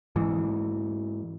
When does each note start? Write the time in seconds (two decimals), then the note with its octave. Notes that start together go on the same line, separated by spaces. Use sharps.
0.16 G#2 E3